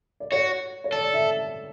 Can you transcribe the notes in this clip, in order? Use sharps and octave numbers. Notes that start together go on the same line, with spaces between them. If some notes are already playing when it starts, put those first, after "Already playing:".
D5
F#4 C#5
C#5
A4 D5
E5